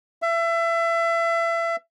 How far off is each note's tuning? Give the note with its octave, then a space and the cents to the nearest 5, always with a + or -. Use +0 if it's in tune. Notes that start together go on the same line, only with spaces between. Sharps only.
E5 +30